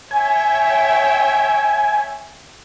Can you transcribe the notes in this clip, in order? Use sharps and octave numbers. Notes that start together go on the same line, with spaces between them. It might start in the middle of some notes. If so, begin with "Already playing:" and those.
C#5 E5 G5 G#5